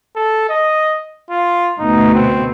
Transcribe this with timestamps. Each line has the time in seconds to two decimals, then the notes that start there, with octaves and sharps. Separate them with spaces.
0.16 A4
0.49 D#5
1.30 F4
1.79 D2 B2 A3 D#4
2.14 C4